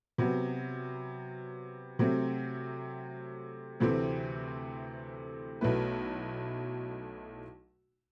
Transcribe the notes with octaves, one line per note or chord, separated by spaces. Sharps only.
C3 F#3 B3
C3 F#3 A3 C4
D2 C3 E3 A3 C4
B1 B2 A3 E4 B4